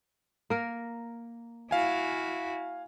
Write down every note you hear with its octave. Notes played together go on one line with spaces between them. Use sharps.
A#3 A#4
E4 F#4 F5 G#5